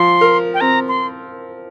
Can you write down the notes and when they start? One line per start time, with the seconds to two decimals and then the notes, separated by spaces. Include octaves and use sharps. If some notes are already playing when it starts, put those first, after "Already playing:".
Already playing: F3 C6
0.21 A#4
0.54 G5
0.61 C4 A#5
0.88 C6